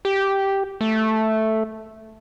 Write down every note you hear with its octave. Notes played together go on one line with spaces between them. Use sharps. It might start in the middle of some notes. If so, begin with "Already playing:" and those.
G4
A3